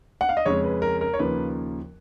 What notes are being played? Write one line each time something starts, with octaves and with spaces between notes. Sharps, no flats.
F#5
F5
D#5
F2 C#3 G#3 C#4 C#5
B4
A#4
A#4
C#5
D#2 C#3 F3 A#3 B4